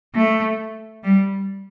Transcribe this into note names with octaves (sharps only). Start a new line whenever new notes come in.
A3
G3